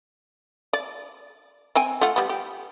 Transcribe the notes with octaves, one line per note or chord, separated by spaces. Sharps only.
D5
C4 G5 G#5
A3 F4 F#5
G3 B3
G4